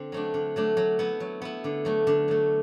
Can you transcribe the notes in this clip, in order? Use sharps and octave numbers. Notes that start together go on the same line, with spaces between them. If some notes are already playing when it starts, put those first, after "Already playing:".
Already playing: D3 C4
F#3 A3 D4
D3
F#3 A3 D4
F#3
B3 E4
F#3
B3 E4
D3
F#3 A3
D3
F#3 A3